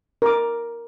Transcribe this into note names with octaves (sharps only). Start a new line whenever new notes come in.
A#4 D6